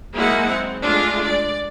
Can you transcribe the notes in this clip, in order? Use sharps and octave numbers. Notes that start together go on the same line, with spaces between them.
F#3 G#3 A#3 D#4 E4 F#5
C4
G#3 A3 D4 F4
D5